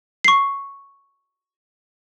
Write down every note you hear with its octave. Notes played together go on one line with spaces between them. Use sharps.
C#6 C7